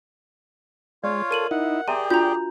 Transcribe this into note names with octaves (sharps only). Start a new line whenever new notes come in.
G#3 F4 C#5 D5 F5
A4 A#4 D#7 F#7
D#4 E4 F#5
G4 G#4 D5 E5 G5 A#5 C6 D#7
D4 F4 F#4 A#5 G6